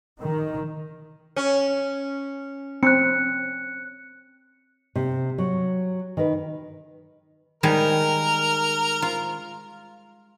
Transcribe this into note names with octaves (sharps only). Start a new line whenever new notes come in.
D#3
C#4
C4 F#6 C#7
C3
F#3
D#3 B4
D#3 G3 G#3 A#4
F4